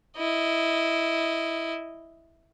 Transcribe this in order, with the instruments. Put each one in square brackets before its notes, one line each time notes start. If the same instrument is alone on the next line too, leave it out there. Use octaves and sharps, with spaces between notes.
[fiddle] E4 D#5